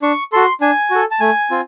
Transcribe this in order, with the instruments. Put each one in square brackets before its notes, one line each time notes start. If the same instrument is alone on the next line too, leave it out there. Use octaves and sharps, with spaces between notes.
[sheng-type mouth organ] D4 C#6
F#4 A4 C6
D4 G#5
F#4 A4
A5
A3 G#5
C4 F4